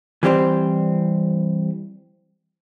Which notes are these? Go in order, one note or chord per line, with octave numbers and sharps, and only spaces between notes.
E3 G3 C4 G4 C5